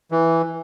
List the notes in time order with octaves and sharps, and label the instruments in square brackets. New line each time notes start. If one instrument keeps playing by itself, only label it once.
[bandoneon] E3